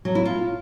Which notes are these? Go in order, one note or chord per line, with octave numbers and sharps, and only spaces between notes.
F#3
E4
F4